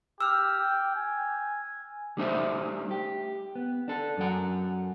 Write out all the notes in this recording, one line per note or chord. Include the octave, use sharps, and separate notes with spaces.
G4 E6 F6
G5
G#5
G3 A3 D4 D#4 C5 E5
G4
B3
D4 A4
F#2 F#3 F#5